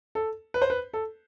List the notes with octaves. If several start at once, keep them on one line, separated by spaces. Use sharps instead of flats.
A4
B4
C5
B4
A4